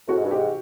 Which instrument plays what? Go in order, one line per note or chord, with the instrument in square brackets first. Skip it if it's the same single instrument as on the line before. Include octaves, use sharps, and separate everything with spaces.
[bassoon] A2 [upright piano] F#4
[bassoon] G#2
G2
[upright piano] G4
[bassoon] G#2